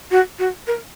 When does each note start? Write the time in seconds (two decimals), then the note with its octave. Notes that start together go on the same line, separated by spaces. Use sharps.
0.11 F#4
0.39 F#4
0.67 A#4